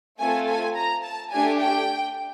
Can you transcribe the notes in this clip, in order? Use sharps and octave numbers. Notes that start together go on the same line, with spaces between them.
A3 C4 F4 A4 G#5
G#5
A#5
A5
A3 D4 G4 G#5
G5